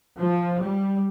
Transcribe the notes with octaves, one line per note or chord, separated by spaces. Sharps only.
F3
G3